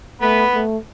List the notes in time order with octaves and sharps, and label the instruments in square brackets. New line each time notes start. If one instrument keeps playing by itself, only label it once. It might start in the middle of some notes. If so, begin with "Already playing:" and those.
[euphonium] A3 [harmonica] B3 B4
[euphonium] A3